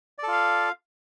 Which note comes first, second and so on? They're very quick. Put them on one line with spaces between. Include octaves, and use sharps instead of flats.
D5 A4 F4 F5